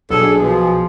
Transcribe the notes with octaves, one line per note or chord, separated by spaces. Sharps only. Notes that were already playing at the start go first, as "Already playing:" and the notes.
B1 D4 G#4 A4
B2 F3